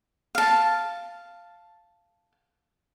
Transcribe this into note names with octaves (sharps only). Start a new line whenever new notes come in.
F5 A5